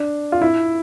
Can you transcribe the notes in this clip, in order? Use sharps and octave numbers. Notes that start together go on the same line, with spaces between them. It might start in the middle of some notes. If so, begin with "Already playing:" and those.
Already playing: D4
F4
E4